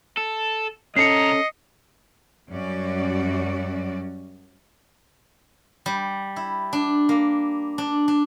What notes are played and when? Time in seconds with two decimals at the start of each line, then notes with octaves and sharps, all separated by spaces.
0.17 A4
0.96 C2 C#4 A4 D#5 A#5 C7 C#7
2.49 F#2 G3 C#4 F#4 D5
5.86 G3
6.36 E4
6.73 D4
7.09 A#3
7.78 D4
8.08 D4